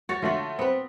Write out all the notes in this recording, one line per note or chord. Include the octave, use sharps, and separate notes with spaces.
F#4 C#5 A6
D3 A3 F4 F#4
B3 C4 B4